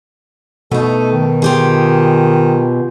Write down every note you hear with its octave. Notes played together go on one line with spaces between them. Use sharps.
B2 A3 D#4 A4
D#3
F4 G4 G#4